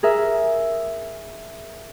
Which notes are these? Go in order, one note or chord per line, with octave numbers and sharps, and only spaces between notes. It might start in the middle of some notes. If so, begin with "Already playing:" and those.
G#4 A#4 E5